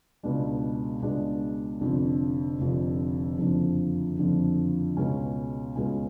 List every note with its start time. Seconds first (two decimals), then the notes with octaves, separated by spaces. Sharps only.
0.23 C#2 B2 G#3 D4
1.02 C#2 B2 G#3 D4
1.81 F1 F2 D3
2.60 F1 F2 D3
3.39 F#1 F2 D3 F3
4.18 F#1 F2 D3 F3
4.97 C#2 B2 G#3 C#4
5.76 C#2 B2 G#3 C#4